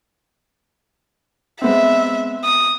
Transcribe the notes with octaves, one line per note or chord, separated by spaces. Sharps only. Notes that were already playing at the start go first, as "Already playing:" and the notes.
G#3 B3 C4 E5
D#6